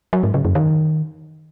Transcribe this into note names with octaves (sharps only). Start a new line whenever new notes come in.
F#3
G#2
C#3
F#2
D#3